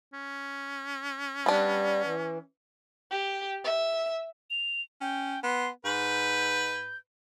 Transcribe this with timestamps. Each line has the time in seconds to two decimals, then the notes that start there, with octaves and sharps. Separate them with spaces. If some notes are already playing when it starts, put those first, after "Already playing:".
0.13 C#4
1.46 G3 B3 D4
2.04 E3
3.11 G4
3.64 E5
4.50 F7
5.01 C#4 G5
5.43 B3 C6
5.85 G#2 B4 G6